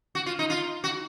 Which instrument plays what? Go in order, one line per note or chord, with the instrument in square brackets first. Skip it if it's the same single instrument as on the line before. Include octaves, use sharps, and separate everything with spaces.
[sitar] F#4
F4
D#4
F4
F#4